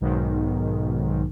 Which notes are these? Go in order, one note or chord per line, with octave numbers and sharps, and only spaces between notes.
B1 G#2 D#3